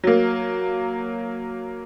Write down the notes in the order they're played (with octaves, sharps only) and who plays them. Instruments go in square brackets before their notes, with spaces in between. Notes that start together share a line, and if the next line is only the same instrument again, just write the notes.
[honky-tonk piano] F#3 A#3